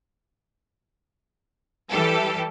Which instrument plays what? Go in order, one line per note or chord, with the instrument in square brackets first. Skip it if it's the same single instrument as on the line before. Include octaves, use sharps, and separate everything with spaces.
[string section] E3 G3 G4 A4